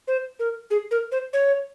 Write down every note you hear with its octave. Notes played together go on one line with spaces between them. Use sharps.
C5
A#4
G#4
A#4
C5
C#5